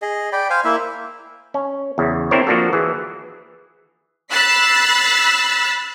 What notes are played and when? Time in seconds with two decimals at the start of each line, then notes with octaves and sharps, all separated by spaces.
0.02 G#4 D#5
0.32 D5 G5 B5
0.50 C5 F5 G#5
0.65 A#3 E4 E5
1.54 C#4
1.98 E2 C#3
2.31 C4 D4 E4 A#4 C5 C#5
2.47 F3 A#3 D4 F#4 A4
2.73 E3 G#4
4.31 B5 E6 F#6 A6 B6 C7